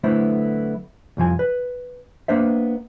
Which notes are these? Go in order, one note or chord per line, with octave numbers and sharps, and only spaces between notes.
D3 F#3 A3 B3 E4 C5
C2 F2 F3 G#5
B4
A#3 B3 D4 C5 E5